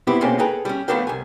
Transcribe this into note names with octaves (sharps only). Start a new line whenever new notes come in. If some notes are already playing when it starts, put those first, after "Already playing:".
B3 C4 E4 G4
B2 G#3 A#3 C4 C#4
G#4 A4 B4 G5 A#5
G3 C#4
F3 A3 B3 D4 A#4 G5
C2 G#5